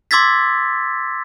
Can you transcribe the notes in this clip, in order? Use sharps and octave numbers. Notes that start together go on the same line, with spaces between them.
C6 D6 E6 G#6 A6 B6